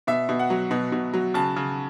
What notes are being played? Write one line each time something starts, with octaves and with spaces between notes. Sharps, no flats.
B2 E5
B2
F#5
F#3
B2
B2
F#3
C#3 A5
C#3